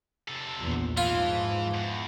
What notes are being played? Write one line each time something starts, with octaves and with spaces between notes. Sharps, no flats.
C3 A4
A#1 E2
G#2 E3 F3 F4
E2